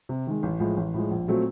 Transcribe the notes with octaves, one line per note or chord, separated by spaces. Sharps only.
C3
D#3 G#3
A1
A2 F3 G#3
A1
A2 F3 G#3
A#1
A#2 F#3 A3 C4